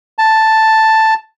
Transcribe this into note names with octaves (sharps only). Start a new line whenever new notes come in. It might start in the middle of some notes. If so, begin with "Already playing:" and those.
A5